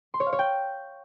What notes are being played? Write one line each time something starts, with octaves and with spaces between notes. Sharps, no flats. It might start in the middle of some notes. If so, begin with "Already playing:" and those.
C6
C#5
F5
C#5
G5